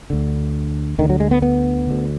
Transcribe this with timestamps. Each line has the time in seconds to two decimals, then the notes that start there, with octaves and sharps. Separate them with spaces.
0.10 D2 D3
0.98 D2 D3 D#3
1.10 F#3
1.20 G#3
1.31 B3
1.42 B3
1.87 D2 D3